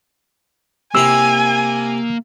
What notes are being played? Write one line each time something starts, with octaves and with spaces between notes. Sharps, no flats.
C3 A#3 E4 G#5 A#5 E6